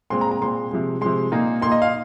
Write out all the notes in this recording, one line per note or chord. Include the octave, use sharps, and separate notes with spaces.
A#2 G#3 C4 C6
A#5
A#5
A#2 G#3 C4 C6
C3 F3 G#3
C3 F3 G#3 C6
A#2 A#3 D#4
A#2 A#3 D#4 C6
D#5
F5